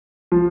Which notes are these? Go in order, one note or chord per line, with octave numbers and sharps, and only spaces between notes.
F3